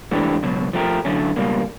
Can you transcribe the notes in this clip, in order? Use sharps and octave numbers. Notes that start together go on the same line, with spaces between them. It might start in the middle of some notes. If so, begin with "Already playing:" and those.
G#2 E3 A3 D4 G4
C#2 B2 F#3
F3 A3 D4 G4 A#4
D3 F#3 A3 C#4
C#2 B2 G3 A#3